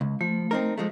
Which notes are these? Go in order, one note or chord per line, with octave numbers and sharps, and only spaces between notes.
C#2
F3 A3
C4 D#4 A#4
F3 G#3 A3